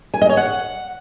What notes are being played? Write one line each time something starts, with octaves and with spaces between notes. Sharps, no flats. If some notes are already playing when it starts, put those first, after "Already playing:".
G#5
D#5
C#5
F#5